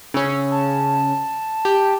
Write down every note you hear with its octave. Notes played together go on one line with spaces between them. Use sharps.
C#3 C#4 E6
A5
G4